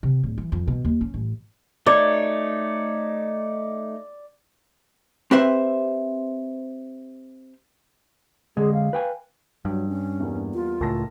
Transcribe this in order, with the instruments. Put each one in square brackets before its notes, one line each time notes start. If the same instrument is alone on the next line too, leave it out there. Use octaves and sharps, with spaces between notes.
[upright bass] C3
D1
E3
F2
B2
D#2
C#4
A1
[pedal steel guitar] A3 D#4 C#5 [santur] D5
[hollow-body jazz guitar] C4 G4 B4 C5 E5
[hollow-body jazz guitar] D3 G#3 [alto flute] G#4
[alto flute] F5
[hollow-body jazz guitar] B4 G5 G#5
[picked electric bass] G2 [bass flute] F#3
[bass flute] C#4
[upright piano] E2 G3 A#3
[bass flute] F4
[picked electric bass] C#2 A2 [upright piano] A#4 A5 A#6